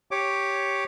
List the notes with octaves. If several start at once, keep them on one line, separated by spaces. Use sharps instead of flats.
G4 C#5 D6